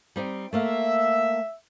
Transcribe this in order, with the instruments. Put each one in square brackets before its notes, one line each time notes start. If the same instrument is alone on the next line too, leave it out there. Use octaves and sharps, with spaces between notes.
[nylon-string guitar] G3 C4 D#4
[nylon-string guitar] A3 A#3 F5 [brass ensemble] E5